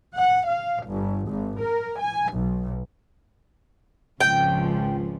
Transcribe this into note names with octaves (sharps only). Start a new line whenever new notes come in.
F#5
F5
G1
G#1
A#4
G#5
B1
G#1 C#2 F3 G5